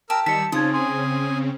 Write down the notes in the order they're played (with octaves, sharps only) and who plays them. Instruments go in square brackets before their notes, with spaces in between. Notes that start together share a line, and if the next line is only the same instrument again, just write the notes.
[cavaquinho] G4 A5 [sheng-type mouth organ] A#4 E6
[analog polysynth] D#3 G3 D#4 [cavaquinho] A5 [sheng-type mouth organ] E6 [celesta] B6 C#7
[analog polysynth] C#3 C4 C#4 [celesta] D#4 G#6 [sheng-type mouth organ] F4 [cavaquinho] D#6
[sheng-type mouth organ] G#4 G#5 [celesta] C6